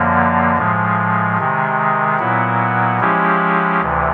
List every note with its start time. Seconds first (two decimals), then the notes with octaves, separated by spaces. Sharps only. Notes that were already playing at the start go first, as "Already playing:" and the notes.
Already playing: F#2 D3 F3 A#3
0.57 A2 F3 G#3
1.38 C3 D#3 G#3
2.19 A#2 F#3 B3 E4
3.00 F3 G#3 C#4 E4 G4
3.81 D2 C3 E3